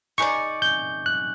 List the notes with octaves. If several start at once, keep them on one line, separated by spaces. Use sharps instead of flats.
D#4 G#4 B4 D5 C#6
G6
F#6